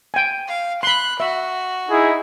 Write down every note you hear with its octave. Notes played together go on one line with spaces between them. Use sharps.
G5 G#5
F5
B5 C6 F#6
F#4 E5
D#4 E4 G#4